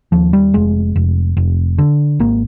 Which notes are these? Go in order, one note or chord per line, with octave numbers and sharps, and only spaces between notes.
D#2 F3
G3
F1 G#3
F1
F1
D3
G#1 A#3